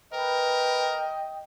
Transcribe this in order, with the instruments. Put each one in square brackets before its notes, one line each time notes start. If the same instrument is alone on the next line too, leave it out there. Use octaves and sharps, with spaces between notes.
[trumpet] A#4 [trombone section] B4 [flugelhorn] D#5 [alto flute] G5